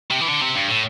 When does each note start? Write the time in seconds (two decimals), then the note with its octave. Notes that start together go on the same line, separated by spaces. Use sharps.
0.11 C3
0.21 E3
0.29 D3
0.42 C3
0.55 G2
0.68 A2